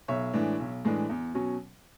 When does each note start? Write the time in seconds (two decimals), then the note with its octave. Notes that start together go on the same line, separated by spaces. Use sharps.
0.08 B1 C#5 E5
0.34 A2 E3 G#3 D4
0.60 B1
0.85 A2 E3 G#3 D4
1.09 E2
1.34 B2 F#3 C#4